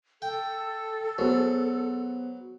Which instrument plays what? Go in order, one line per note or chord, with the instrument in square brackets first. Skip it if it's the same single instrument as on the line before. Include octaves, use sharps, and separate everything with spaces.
[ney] A4 [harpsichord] G5
[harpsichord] F#3 [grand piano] B3 G#4 C5